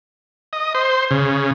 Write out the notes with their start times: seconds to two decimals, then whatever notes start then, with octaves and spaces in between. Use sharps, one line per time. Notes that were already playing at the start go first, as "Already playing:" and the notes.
0.53 D#5
0.75 C5
1.11 C#3